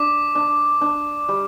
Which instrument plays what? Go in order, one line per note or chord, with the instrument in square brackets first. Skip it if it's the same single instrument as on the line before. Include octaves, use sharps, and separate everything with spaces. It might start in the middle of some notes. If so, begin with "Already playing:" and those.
Already playing: [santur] D4 [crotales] D6
[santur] D4
D4
G3